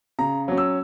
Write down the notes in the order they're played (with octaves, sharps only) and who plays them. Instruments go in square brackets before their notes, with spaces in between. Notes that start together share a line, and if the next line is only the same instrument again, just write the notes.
[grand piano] C#3 A#5
F#3 C#4
E6